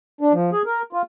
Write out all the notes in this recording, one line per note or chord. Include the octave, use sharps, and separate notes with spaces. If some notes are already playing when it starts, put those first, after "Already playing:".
D4
F3
G#4
A#4
F4